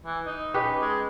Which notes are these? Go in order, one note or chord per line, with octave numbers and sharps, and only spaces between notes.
E3
D#4
C#4 G4 B4
G#3